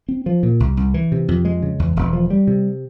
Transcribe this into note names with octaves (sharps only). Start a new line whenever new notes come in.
C4
F3
A#2
C2
C2
E3
C3
F2
G#3
C#3
E2
E1
F3
G3
C3